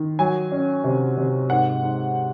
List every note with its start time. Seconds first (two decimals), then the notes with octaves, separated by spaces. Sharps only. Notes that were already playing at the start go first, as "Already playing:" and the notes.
Already playing: D#3
0.19 F#3 G#5
0.52 C#4
0.84 C3
1.17 C3
1.50 G#2 F#5
1.83 G#2